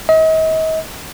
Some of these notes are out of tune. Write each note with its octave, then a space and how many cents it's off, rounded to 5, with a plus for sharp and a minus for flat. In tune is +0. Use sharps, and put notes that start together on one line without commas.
D#5 +40